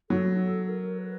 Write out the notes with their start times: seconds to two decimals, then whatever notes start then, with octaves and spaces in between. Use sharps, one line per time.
0.10 F#3 A4
0.68 A#4
0.98 B4